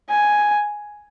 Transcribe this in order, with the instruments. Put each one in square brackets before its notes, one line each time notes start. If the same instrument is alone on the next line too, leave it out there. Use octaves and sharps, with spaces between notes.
[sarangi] G#5